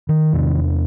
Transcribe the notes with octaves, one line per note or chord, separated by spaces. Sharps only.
D#3
E2 C3